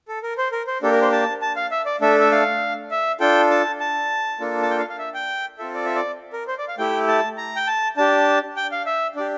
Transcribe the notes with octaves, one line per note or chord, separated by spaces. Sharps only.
A4
A#4
C5
A#4
C5
A#3 D4 G4 A4
A#4
C5
A5
A5
F5
E5
D5
A3 D4 A4 E5
E5
F5
E5
D4 F4 A4 G5
A5
A5
A#3 D4 F4 A4
A5
G5
F5
F5
E5
G5
C4 F4 A4 E5
D5
E5
D5
A#4
C5
D5
F5
A3 E4 G4 G5
A5
A#5
G5
A5
D4 G4 A5
G5
F5
E5
D4 G4 D5